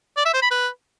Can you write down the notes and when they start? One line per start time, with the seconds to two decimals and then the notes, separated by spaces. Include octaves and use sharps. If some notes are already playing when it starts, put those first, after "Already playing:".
0.17 D5
0.25 E5
0.34 C5
0.42 B5
0.51 B4